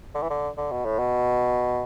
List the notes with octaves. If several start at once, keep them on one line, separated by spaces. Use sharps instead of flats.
D3
E3
D3
D3
B2
A2
B2